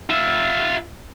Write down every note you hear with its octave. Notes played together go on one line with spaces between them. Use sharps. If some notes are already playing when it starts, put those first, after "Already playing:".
F4 E5